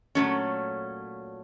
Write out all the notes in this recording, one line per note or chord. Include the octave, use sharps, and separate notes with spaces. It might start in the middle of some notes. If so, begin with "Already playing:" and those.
A#2 F#3 A3 C#4